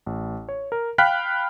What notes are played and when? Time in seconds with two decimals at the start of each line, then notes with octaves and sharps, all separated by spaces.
0.06 A1
0.49 C#5
0.72 A#4
0.98 F5 G5 B5 F6 F#6 B6